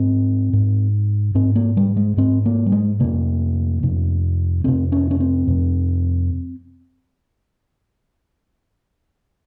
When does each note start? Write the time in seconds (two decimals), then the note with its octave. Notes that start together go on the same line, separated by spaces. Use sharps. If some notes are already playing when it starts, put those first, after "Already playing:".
Already playing: G#2 C4
0.53 G#2
1.35 G#2 C4
1.56 A#3
1.77 G3
1.96 G#3
2.17 G#2 C4
2.46 A#3
2.66 G3
2.72 G#3
3.00 F2 C3 A#3
3.83 F2 C3
4.64 F2 C3 C4
4.92 C#4
5.11 C#4
5.20 C4
5.48 F2 C3